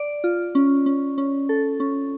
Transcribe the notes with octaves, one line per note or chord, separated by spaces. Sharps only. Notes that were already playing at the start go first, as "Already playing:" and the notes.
Already playing: D5
F4
C#4
C#4
C#4
A4
C#4